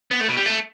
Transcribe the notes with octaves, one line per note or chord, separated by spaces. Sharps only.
B3
A3
B2
G3
A3